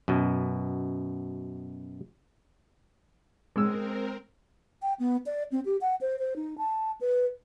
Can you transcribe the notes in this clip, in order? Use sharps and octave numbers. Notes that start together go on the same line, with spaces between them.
F#2 B2
G#3 C4 A#4 E6
G5
B3
D5
C4
G4
F#5
C5
C5
D#4
A5
B4